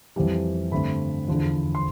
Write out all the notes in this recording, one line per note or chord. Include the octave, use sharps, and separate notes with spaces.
F2 E3 G3
G2 D3 A3 C4 B5
E2 D3 F3
C6